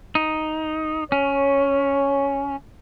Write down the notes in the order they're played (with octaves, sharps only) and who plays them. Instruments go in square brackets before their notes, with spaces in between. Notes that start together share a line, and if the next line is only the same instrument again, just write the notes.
[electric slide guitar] D#4
[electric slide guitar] C#4 [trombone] C#5